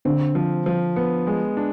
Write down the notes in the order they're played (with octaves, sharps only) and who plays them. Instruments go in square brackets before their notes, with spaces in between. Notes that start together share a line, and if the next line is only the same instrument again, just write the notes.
[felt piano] D3 [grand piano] C4
[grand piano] F3
F3
B3
G#3
D4